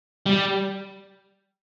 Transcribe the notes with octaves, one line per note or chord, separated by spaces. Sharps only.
G3